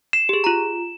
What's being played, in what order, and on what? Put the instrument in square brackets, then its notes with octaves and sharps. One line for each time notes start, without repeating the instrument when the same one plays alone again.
[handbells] C7 [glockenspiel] E7
[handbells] G4 G#4
F4 A#5